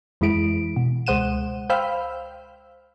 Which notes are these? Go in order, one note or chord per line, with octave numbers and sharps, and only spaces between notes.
F2 E3 G#3 E4 D7
B2
C#2 G#3 C5 F#5 D#7 E7
C5 F5 G5 B5 E6 F6